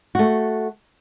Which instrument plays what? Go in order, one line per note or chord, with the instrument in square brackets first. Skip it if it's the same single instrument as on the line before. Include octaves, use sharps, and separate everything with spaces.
[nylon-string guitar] A3 F#4